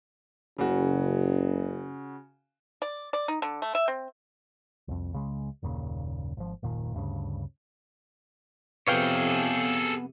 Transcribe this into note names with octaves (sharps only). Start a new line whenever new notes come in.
F#1 C#3 F#4
D5
D5
D#4
D3
A3
E5
C4
C2 F2
C#2 C#3 G#3
F#1 D#2 A#2 C#3
G#1 F3
F#1 D#2 A#2 D#3
D2 G2 C#3
F2 C3 B3 G#4 A4 C#5 F5 G5